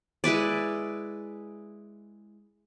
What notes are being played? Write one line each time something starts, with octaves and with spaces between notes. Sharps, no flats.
G#3 E4 B4 D5